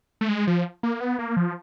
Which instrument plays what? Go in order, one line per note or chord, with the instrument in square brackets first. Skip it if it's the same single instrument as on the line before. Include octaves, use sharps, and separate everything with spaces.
[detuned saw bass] A3
G#3
F3
A#3
B3
A#3
F3